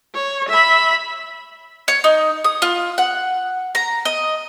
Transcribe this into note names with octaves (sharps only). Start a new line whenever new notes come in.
C#5
E5 B5
C#5
D#4
D#6
F4
F#5
A#5
D#5